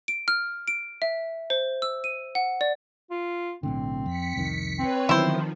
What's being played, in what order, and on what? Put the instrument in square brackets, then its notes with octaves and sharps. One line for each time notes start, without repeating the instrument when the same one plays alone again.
[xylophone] D7
F6
D7
E5
C5
E6
D#7
F#5
D5
[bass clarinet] F4
[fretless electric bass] B1 A2 D3 [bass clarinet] C4
[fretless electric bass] F2 [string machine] B6 C#7
[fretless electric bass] C2 F2 D#3
[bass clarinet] C4 [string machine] B4 C#5
[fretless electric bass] D3 F#3 B3 [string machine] D#3 F3 [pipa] E4 C5